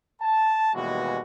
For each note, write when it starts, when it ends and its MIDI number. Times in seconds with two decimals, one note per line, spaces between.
0.21 0.70 81
0.74 1.22 39
0.74 1.22 47
0.74 1.22 52
0.74 1.22 55
0.74 1.22 56
0.74 1.22 66